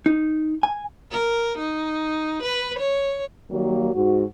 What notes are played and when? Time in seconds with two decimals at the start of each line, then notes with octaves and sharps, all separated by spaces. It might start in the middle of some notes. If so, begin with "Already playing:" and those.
0.06 D#4
0.63 G#5
1.11 A#4
1.58 D#4
2.43 B4
2.79 C#5
3.49 D#3 F#3 G3 A#3
3.94 G#2 F#4